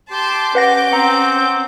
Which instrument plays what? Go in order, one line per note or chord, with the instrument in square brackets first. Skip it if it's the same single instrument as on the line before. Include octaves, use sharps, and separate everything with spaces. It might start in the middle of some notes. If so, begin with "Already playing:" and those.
[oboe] G4 [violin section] A5 C6 D6
[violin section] C#4 D6 G6 [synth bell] B4 F#5 A#6
[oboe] C4 [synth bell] F#5 A#5